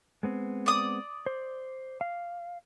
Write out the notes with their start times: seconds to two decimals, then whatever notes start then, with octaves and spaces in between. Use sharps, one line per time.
0.23 G#3 B3 C4
0.66 D5 D#6
1.26 C5
2.01 F5